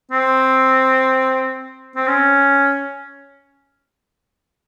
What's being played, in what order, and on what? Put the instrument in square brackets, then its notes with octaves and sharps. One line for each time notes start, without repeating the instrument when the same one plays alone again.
[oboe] C4
C4
C#4